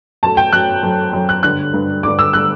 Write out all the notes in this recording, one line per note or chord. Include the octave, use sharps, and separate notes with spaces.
F#2 F#3 A3 A5
G5
F#2 F#3 A3 F#6
F#2 F#3 A3
F#2 F#3 A3
F#6
G2 D3 G3 F#6
G2 D3 G3
G2 D3 G3 D6
E6
D3 G3 F#6